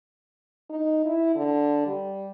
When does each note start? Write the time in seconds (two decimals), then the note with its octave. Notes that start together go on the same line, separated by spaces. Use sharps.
0.70 D#4
1.05 E4
1.35 D3
1.87 G3